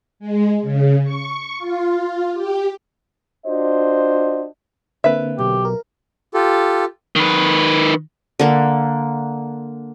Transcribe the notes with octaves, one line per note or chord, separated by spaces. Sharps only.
G#3
C#3
C#6
F4
G4
D4 F4 F#4 C5 D#5
D3 A#3 C4 B4 E5
B1 G4
A#4
F4 G4 A4
D#3 B4
D3 A#3